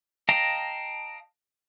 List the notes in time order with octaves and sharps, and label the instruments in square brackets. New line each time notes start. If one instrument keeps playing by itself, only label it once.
[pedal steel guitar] D#5 F5 G5 A5 A#5